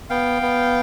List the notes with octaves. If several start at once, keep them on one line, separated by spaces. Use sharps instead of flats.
B3 F5 G5
B3